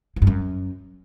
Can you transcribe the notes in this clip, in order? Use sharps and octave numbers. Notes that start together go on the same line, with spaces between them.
E3
G2
F#2